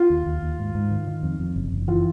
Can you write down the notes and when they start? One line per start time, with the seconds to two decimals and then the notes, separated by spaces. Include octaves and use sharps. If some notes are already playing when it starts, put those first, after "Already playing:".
Already playing: F4
0.10 D#2
0.26 D#2
0.43 D#2
0.59 G#2
0.75 G#2
0.91 D#3
1.07 D#3
1.23 F2
1.40 F2
1.56 F#1
1.72 F#1
1.88 E3 F4